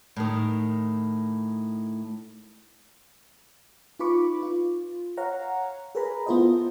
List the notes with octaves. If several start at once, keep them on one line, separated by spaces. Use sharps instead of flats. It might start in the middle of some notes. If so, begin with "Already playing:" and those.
A2 D#3
D#4 F4 B4 B5 C#6 D6
F4
C#5 F5 F#5 A#5
G#4 A#4 B4 G#5 A#5 B5
B3 E4 F4 A4 C5 D#5